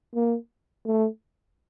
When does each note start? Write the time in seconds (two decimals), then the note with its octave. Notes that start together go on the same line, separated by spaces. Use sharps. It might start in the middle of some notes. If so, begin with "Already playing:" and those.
0.15 A#3
0.86 A3